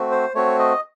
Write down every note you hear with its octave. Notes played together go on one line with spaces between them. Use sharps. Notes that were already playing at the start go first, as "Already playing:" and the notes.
Already playing: A3 C4 F#4
C5
A3 C4 F#4 C#5
D#5